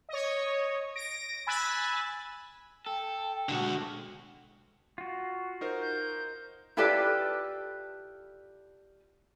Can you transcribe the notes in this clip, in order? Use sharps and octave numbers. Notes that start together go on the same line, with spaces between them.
C#5 D#5
A#6 D7
G#5 B5 E6 F#6 A6
A4 G5
B2 D3 G#3 F#4
F4 F#4
D#4 A#4 C5
G6
E4 F4 G4 A4 B4 D5